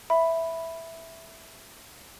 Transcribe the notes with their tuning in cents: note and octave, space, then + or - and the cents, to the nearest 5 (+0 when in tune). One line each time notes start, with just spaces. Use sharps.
E5 +0 B5 +0